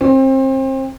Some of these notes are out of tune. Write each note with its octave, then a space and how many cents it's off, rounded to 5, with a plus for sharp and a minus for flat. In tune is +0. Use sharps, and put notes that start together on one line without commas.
C4 +30